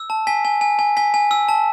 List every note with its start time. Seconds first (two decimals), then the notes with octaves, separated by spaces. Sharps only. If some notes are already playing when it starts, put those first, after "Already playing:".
Already playing: E6
0.10 A5
0.27 G#5 B6
0.45 G#5
0.61 G#5
0.79 G#5
0.97 G#5 B6
1.14 G#5
1.31 E6
1.49 A5